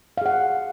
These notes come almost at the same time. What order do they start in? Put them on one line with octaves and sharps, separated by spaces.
F5 G#4 F#5